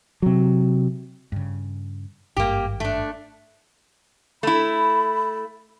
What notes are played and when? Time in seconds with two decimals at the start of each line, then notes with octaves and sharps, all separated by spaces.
0.22 C3 F#3
1.32 G2 C#3
2.36 G#1 G2 A#3 G4
2.80 A3 D4
4.43 A3 E4 B5